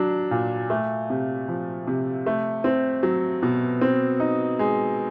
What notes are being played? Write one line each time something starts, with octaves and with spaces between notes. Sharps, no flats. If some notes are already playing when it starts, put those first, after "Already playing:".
Already playing: F#3 D4
A#2
A3
C3
F3
C3
A3
C4
F#3
B2
C4
D#4
G#3